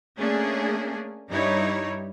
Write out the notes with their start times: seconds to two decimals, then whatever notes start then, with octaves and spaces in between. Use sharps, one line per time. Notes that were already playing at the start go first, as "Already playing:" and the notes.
0.17 A3 A#3 C#4 D4 G#4
1.30 G2 G3 D#4 E4 C#5